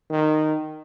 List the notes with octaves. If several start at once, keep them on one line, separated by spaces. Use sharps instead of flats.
D#3